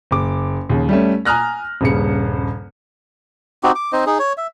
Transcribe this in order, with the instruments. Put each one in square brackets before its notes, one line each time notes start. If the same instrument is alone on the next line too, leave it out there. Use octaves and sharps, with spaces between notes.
[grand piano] F#1 D6
D#2 C#3
G3 A3 C#4
G#5 A#5 D#6 F6 F#6 A#6
D#1 G2 C#3 C#7
[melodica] C4 D#4 F#4 G4
D6
C4 D#4 C5 D#5
D#4 G#4
C#5
E5